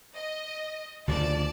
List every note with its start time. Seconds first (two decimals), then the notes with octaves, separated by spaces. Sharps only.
0.14 D#5
1.08 D2 C#3 F3 D5 A5